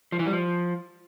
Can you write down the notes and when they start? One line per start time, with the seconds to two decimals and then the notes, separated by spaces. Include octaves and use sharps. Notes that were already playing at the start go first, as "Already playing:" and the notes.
0.12 F3
0.19 E3
0.26 G3
0.33 F3